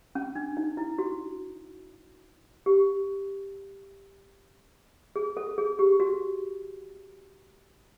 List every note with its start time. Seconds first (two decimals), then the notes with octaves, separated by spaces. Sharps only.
0.15 C#4
0.36 D4
0.57 D#4
0.77 E4
0.99 F#4
2.66 G4
5.16 G#4
5.37 A4
5.58 G#4
5.79 G4
6.00 F#4